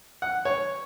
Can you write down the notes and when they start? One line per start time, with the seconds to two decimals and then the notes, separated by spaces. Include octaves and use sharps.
0.22 F#5
0.45 C#5